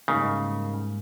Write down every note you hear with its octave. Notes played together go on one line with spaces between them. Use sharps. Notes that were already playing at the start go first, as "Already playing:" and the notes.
G#2 C#3 G3 A#3 D#4